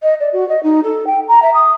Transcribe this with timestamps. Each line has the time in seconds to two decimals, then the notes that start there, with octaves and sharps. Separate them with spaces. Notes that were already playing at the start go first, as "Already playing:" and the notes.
0.03 D#5
0.20 D5
0.33 F#4
0.49 D#5
0.63 D#4
0.84 A4
1.07 G5
1.28 A#5
1.42 E5
1.54 D#6